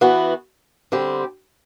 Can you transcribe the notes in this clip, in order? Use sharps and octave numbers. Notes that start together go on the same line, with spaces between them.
E3 B3 F#4
D3 G3 C4 G4